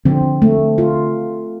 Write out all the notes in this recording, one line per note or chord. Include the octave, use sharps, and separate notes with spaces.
D3 F3 C4
A3
F4